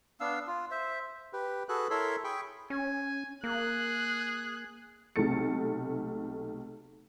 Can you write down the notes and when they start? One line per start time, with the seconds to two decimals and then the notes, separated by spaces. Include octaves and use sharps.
0.21 B3 D4 F5 E6
0.47 F4
0.71 C5 E5
1.33 G4 B4
1.69 F#4 G#4 A4 B4 F#6
1.91 E4 A4 A#4 C#5 B5 C6
2.24 G#4 G5 B5 C#6
2.70 C#4 G#5
3.44 A#3 G#4 F#6
5.16 B1 C3 G#3 A3 A6 C#7